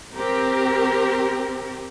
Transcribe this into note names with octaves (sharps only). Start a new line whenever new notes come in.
C4 G4 A#4